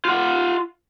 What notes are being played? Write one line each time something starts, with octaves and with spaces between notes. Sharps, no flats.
F4 F#5